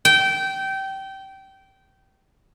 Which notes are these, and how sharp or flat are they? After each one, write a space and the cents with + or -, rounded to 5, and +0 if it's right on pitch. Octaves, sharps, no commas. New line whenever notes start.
G5 -20